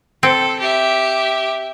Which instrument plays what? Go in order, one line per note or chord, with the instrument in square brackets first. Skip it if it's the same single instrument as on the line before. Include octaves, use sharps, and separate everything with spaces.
[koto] C4 [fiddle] A4
[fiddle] G4 E5